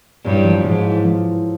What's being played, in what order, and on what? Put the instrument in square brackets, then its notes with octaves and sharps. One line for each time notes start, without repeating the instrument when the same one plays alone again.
[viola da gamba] G2 [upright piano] E3 F#3
[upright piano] F3
[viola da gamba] G#2 [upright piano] F3
[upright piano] E3
F3
E3